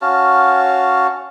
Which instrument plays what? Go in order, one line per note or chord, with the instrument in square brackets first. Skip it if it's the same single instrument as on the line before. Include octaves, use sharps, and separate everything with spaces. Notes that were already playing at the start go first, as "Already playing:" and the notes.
[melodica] C#4 F#4 F5 A5